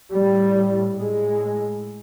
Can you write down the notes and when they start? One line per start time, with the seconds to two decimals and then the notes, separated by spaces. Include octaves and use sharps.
0.14 A2 G3
0.98 A2 G#3